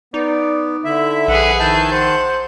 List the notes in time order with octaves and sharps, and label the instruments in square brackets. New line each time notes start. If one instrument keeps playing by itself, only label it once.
[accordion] B3 [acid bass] D#4 [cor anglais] D5
[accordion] D3 E5 [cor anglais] E4
[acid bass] A#1 [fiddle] G#4 B4 [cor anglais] F#5
[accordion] D#3 A5 G6 [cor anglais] E4
[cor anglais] C5 [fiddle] F#5